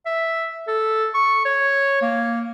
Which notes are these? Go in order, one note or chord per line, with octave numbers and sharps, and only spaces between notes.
E5
A4
C#6
C#5
A#3